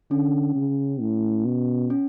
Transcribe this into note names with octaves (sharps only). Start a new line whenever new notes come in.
D3 C#4
C#3
A2
B2
C#4